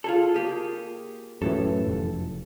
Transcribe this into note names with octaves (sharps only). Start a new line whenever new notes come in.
F4 G#4 A4
A#3 G4 G#4
F#2 A2 E3 A4
F1